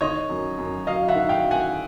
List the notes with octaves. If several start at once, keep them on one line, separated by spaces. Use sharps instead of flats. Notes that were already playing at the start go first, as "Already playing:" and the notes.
D#3 C#5 D#5
F#2
F#2
F#3 D#5 F5
E5 F#5
D#3
F5 G5
F#2
F#5 G#5